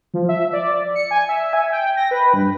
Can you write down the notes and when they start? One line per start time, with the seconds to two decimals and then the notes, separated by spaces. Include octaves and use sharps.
0.14 F3
0.29 E5
0.53 D5
0.95 C#7
1.11 G#5
1.29 E5
1.53 G#5
1.72 G5
1.97 A#6
2.11 B4
2.33 G2